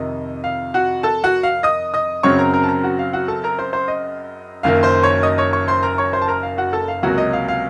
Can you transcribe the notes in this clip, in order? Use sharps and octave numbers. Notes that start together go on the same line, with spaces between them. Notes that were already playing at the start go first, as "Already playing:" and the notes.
Already playing: F2 C3 D#3 D#5
F5
F#4 F#5
A4 A5
F#4 F#5
F5
D#5 D#6
D#5 D#6
F#2 C#3 F#3 C4 C#5 C#6
A#4 A#5
A#4 A#5
A5
A#4 A#5
F#4 F#5
F5
F#4 F#5
A4 A5
A#4 A#5
C5 C6
C5 C6
D#5
F#1 F#2 D#3 A#3 F5
C5 C6
C#5 C#6
D#5 D#6
C#5 C#6
C#5 C#6
C5 C6
A#4 A#5
C#5 C#6
C5 C6
A5
A#4 A#5
F5
F#4 F#5
A4 A5
F5
C#2 C3 F#3 A#3 F#4 F#5
D#5
F5
F5